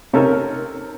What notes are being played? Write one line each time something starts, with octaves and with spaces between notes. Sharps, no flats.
C3 C#4 D#4 A4 A#4